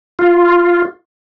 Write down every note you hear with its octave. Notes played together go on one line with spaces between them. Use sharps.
F4